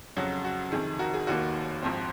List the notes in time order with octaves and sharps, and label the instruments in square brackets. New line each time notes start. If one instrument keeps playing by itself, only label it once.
[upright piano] F2 C#3 F#3 F#4
F#4
F2 C3 D#3 G#4
F#4 A#4
G#4
F1 D#2 D#3 A#3 F#4
A#1 G#2 F3 C4